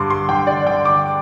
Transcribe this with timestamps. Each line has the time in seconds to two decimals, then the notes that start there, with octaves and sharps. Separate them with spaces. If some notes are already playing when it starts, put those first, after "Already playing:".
Already playing: G2 D3 C6 D6
0.10 C6
0.29 D3 G5
0.47 D5
0.66 D3 G5
0.85 D6